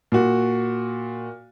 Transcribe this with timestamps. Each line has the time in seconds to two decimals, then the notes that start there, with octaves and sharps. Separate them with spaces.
0.12 A#2 F#4